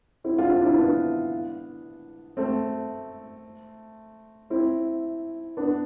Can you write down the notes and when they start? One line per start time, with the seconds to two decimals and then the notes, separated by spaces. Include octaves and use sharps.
0.24 C4 E4
0.38 D4 F4
0.51 C4 E4
0.61 D4
0.64 C4 E4
0.78 B3 D4
2.37 A3 C4
4.50 C4 E4
5.57 B3 D4